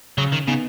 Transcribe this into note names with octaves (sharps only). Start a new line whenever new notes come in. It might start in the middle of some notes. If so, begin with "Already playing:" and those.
C#3 F#3
D#3
C#3 B3 D#4